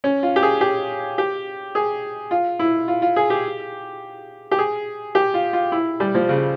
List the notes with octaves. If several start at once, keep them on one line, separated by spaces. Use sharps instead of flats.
C#4
F4
G4
G#4
G4
G4
G#4
F4
E4
F4
F4
G#4
G4
G4
G#4
G4
F4
F4
E4
G3
F3
C#3